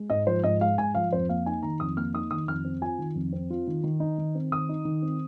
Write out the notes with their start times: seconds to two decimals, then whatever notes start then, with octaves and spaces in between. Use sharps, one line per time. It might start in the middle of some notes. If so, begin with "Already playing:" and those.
Already playing: G#3
0.10 G#2 D#5
0.27 F3 C5
0.44 G#2 D#5
0.61 G#3 F5
0.78 G#2 G#5
0.95 F3 F5
1.12 F2 C5
1.29 A#3 F5
1.46 D#4 G#5
1.63 D#3 A#5
1.80 F2 D#6
1.97 A#3 F6
2.14 D#4 D#6
2.31 D#3 D#6
2.47 F2 F6
2.65 C4
2.82 F4 G#5
2.99 D#3
3.15 F2
3.33 C4
3.50 F4
3.67 D#3
3.84 D#3
4.00 D#4
4.18 D#3
4.35 C4
4.52 D#3 D#6
4.69 D#4
4.85 D#3
5.02 C4